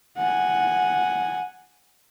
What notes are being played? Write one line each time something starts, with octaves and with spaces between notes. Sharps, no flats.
F#5 G#5